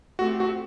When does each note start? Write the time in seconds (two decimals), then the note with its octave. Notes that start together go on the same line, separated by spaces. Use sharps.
0.19 A3 C4 F#4 G4
0.40 F#4